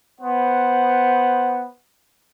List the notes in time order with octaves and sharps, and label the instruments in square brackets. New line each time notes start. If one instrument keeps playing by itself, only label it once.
[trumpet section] B3 C5 F#5